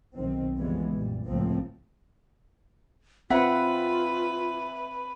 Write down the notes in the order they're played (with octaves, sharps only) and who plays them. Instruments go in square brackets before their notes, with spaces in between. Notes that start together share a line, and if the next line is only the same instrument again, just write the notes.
[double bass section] B1 D#3 C4
F2 C#3 E3 G3 G#3 B3
F#1 A#2 G3
C#2 A2 F3 A#3 C4
[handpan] C4 F#5 [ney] F4 [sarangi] B4 [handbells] E5